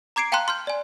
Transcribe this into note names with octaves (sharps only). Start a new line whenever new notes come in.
A#5 D6 G#6 C7 D7
F5 G5 A5 A#5 C6 F#6
C6 F6 G6
D5 G#5